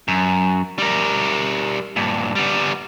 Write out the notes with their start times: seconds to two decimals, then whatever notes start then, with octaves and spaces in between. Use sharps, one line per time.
0.08 F#2
0.79 G3 A#4
1.96 G2 A#2
2.35 G3 B3